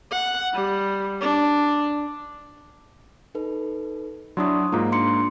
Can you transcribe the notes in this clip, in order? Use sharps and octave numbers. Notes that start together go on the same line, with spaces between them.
F#5
G3
D4
D#4 A4 B4
F#3 D4 E4 C6 C#6 D#6
G#2 A#3 F4 A#5
D4 C6 C#7